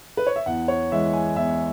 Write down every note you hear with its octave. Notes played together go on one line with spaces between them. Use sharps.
B4
C#5
E5
E2 F#5
C#5
E3 G#3 E5
G#5
E2 E5